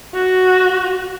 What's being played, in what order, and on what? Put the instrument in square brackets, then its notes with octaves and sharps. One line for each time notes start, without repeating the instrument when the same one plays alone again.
[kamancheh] F#4